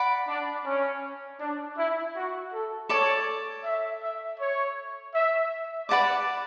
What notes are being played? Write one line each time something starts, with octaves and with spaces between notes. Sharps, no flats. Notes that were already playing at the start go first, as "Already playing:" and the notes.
Already playing: D5 F#5 B5 D6
D4
C#4
D4
E4
F#4
A4
A4 C#5 D5 A5 D6
E5
E5
C#5
E5
B4 D5 F#5 A5 D6